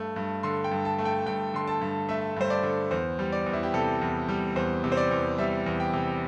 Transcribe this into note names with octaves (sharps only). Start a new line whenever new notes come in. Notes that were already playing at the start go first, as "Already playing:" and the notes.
Already playing: G2 A3
G2
D3 C6
G5
G2
A5
A3
G5
G2 G5
D3 C6
A5
G2
A3 E5
G2 C5
D5
D3
E2 C5
G3
D5
E2
E4
G4
C3 A4
E2
G3
E2 C5
C3
C5
D5
E2
G3 E5
E2
G5
C3